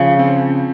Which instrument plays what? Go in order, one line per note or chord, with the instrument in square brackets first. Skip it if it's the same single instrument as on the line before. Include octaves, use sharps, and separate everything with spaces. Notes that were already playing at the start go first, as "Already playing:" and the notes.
Already playing: [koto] C#3 [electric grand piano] F3 F4
[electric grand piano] C4